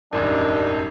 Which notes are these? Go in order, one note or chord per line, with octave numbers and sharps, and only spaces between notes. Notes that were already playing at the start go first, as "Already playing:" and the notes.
E1 A1 F#2 G3 D4 D#4 A#4